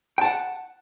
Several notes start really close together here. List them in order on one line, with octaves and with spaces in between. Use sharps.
G5 A5 F#5